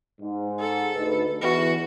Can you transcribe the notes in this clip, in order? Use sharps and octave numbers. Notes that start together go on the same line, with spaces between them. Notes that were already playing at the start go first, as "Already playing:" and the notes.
G#2
A4
D2 D#4 B4
E2 E3 F#4